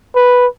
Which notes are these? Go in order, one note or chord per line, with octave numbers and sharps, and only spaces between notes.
B4